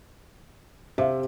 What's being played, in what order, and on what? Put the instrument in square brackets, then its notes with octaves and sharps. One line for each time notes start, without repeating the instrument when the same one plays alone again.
[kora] C3 [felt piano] E5 F5